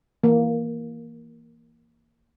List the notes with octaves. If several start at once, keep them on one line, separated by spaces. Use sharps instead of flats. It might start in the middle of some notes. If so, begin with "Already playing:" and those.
E3 A#3